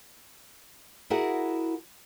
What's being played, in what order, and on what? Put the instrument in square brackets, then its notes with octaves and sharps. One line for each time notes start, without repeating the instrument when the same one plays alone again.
[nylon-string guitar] E4 F#4 G#4 A#4 F#5